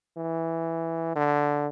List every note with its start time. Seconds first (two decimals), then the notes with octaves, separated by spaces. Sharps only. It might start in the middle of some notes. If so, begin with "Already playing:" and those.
0.17 E3
1.16 D3